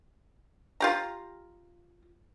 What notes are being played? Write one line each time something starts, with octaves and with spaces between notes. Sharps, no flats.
F4 G4 A#5